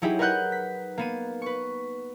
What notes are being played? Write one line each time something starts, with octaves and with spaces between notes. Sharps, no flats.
F#3 D#4 E4 G4 G#4
A#4 B4 D#5 F#5 F#6 G6
B6
A#3 B3 D#7
B4 C#6